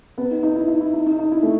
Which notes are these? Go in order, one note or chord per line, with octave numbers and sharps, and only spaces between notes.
B3
D#4
D#4
E4
D#4
E4
D#4
D#4
D#4
E4
A3